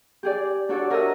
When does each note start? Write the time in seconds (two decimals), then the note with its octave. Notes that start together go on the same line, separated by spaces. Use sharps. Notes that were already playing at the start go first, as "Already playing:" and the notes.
0.23 G4 G#4 D5
0.69 D4 F#4 A4 C#5 D5
0.90 F#4 A#4 C#5 D#5 E5 E6